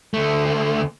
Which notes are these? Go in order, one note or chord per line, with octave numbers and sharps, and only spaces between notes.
D2 A3